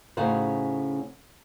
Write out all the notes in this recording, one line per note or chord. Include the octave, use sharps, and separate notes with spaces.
A2 C#3 C#4 D#4 F#4 C5